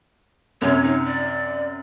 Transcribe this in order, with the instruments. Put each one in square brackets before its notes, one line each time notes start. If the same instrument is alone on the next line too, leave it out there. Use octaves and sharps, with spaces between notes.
[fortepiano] F#2 C3 [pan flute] C#5
[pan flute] D#4
D5